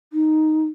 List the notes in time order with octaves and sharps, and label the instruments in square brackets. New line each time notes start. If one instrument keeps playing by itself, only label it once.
[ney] D#4